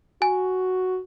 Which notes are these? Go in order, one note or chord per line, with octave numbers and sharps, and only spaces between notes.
F#4 G#5